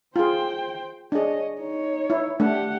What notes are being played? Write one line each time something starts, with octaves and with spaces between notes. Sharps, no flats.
F4 G#4 C5 G5
D4 G#4 C#5 D#5
D#4 C#5
E4
A3 D4 G4 F#5